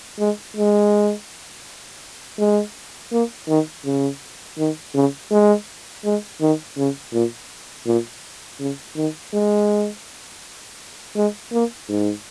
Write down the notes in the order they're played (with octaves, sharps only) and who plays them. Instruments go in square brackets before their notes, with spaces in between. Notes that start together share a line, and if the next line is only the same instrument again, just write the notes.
[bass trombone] G#3
G#3
G#3
A#3
D#3
C#3
D#3
C#3
G#3
G#3
D#3
C#3
A#2
A#2
C#3
D#3
G#3
G#3
A#3
G#2